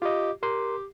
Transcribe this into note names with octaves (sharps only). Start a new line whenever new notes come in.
F4 G4 D#5
G4 A#4 C6